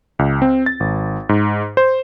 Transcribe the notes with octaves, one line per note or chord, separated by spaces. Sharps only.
C#2
C4
A6
G#1
G#2
C5